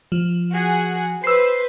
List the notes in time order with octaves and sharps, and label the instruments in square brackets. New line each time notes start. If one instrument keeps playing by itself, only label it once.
[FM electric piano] F3
[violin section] F#4 G#4 F#5
[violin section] B4 C5 [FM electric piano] E6 C7